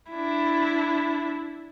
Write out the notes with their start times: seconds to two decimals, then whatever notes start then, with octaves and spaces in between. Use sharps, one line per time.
0.11 D4 E4